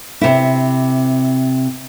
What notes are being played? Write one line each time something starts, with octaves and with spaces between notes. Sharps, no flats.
C3 E4